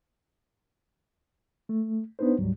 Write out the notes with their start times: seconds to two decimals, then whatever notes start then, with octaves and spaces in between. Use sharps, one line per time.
1.69 A3
2.19 B3 D4 D#4 B4 C5
2.38 D2 G#2 F#3 G3